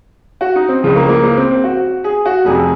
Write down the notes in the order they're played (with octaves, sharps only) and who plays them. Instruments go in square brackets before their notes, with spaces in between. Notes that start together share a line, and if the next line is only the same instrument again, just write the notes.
[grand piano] F#4
D#4
C4
C#2 C#3 F3
A#3
A#3
A#3
C4
C4
F#4
G#4
F#4
F1 F2 C3 G#4